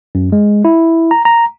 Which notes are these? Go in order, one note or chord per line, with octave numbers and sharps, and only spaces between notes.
F#2
G#3
E4
A#5
A#5